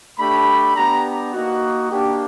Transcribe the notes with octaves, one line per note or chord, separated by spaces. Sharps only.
A3 D4 G4 B5
B3 D4 G4 A#5
A#3 D#4 F#4
A#3 D4 G4